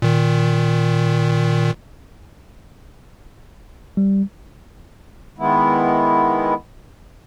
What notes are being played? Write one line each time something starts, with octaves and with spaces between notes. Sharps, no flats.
A#2 D#3
G3
D#3 G#3 B3 E4